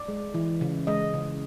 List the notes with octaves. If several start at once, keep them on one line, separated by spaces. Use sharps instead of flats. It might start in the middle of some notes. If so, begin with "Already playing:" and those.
Already playing: D5
G#3
E3
C#3
G#3 D#5
C#3